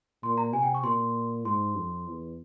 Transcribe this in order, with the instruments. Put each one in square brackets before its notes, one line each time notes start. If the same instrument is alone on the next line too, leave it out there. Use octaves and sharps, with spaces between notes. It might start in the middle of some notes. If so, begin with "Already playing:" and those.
[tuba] A#2 [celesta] C6
[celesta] A#5
[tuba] C3 [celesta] G#5
[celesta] G5
C#6
[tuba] A#2 [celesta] C6
[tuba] G#2 [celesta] C6
[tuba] F2
E2